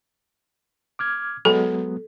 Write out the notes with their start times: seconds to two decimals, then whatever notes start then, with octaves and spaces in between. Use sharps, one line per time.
0.99 D6 F6 G#6
1.45 F#3 G#3 B3 A4